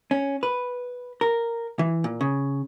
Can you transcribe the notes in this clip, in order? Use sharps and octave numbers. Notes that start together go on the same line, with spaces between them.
C#4
B4
A#4
E3
A#2
C#3